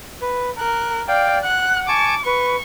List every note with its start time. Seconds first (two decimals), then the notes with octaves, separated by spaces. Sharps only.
0.21 B4
0.58 A#4 F#6
1.08 D5 F5 G5
1.44 F#5 F#6
1.88 G#5 A5 C#6 D6
2.26 B4 C#6